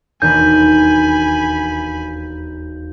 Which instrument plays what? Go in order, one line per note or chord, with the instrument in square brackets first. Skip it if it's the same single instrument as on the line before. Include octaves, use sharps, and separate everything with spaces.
[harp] E1 D#2 D4 [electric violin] G#5 B5 [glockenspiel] G6